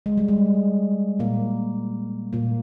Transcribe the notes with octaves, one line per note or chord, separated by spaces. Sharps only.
G#3
G3
G#3
A#2 A#3
A#2 A#3